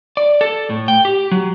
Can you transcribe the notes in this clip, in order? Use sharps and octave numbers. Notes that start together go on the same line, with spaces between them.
D5
A4
A2
G5
G4
F#3